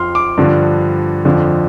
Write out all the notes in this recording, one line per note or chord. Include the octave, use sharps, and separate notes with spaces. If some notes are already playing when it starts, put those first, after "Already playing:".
Already playing: F2 F3 C6 F6
D6
G2 D3 F3
F2 D3 F3